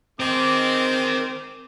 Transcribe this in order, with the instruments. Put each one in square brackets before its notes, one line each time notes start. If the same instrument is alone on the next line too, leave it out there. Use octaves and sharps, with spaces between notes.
[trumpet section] G#3 D6 [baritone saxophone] C4 [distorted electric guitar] A#4 D#5